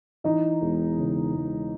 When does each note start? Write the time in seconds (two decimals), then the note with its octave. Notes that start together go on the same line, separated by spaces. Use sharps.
0.24 E3 D#4 D#5
0.62 E1
0.98 C#3
1.34 E1